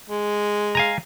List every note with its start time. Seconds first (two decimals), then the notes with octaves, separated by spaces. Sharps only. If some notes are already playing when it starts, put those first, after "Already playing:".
0.09 G#3
0.75 F5 G#5 A#5